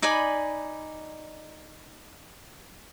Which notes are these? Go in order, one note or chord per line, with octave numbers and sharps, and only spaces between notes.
D#4 D5 G#5 B5